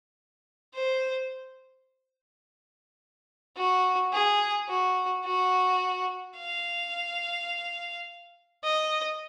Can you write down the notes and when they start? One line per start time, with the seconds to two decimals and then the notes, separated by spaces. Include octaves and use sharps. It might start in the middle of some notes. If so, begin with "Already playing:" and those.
0.74 C5
3.57 F#4
4.13 G#4
4.69 F#4
5.25 F#4
6.38 F5
8.64 D#5